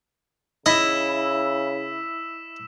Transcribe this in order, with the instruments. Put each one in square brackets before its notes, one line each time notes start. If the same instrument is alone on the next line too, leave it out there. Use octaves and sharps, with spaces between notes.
[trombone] C#3 [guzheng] E4 [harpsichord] D#5 [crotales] E6 B6 E7